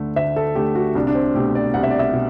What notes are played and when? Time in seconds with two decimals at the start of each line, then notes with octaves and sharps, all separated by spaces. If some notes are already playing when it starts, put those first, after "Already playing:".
Already playing: D2 D3 A3
0.16 D2 E5
0.36 A4
0.55 D3 A3 G4
0.75 F#4
0.95 C2 D4
1.07 D4
1.15 C4
1.34 B2 A3 G4
1.55 D5
1.74 C2 F#5
1.83 E5
1.91 D5
1.99 E5
2.14 B2